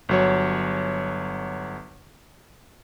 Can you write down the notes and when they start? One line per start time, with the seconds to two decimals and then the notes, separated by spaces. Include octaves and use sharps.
0.09 G1 F#3 C#5